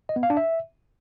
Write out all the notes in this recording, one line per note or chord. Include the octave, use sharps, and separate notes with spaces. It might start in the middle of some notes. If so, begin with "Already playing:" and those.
D#5
B3
F5
D4
E5